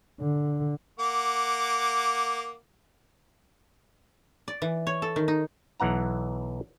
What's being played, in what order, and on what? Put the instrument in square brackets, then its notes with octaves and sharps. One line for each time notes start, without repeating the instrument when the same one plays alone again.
[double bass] D3
[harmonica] A#3 F#5 D6
[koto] D5
E3
C#5
A4
D#3
D#4
[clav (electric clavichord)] B1 E3 F#5 A#5